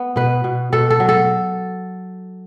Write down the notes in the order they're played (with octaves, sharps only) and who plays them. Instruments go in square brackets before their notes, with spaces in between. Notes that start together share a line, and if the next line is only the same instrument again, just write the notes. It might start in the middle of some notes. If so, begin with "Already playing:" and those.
Already playing: [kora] B3
B2 B4
B2
B2 A4
A4
F#3
A4